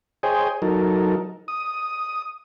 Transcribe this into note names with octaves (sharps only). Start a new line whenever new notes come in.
G#4 C5 C#5 D#5 G5 G#5
F#3 D#4 A4 A#4
D#6